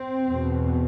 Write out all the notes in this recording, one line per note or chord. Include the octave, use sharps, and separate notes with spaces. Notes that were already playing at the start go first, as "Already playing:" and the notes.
Already playing: C4
E2 B2